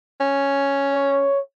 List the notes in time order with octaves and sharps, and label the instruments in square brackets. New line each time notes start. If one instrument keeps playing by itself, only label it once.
[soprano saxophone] C#4
[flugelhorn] C#5